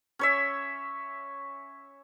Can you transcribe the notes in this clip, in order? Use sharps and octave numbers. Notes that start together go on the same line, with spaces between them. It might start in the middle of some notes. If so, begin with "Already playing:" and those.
C#4 C#5 E5